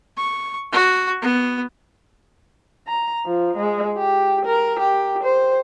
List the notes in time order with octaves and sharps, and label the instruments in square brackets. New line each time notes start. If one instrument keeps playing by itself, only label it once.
[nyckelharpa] C#6
F#4
B3
[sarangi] A#5
F3
G#3
G4
A#4
G4
C5